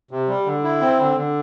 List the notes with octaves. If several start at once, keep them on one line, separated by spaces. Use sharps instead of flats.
C3
G3
D3
E4
C4
D3
D3